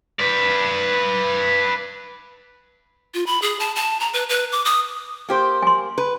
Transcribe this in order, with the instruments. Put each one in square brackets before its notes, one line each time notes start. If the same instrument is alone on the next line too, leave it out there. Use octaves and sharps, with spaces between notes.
[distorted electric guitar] B4 D5
[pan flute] F4
B5
G#4
A5
A5
A#5
B4
B4
D6
D#6
[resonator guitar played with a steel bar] A#3 G4 C5
[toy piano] G#5 C6
[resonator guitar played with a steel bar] B4